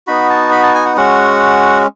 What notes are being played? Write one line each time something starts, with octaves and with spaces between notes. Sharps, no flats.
B3 D#4 F#4 B5
A5
B5
A5
G#5
F#5
G#3 C#4 F#4 F#5